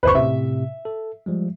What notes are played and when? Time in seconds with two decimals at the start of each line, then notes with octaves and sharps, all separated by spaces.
0.03 G1 D#2 B4 C5 C#6
0.15 A2 C3 E5
0.85 A4
1.26 F3 G3 G#3